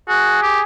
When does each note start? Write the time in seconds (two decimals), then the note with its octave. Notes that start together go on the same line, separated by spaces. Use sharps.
0.09 F#4 G#4
0.43 G4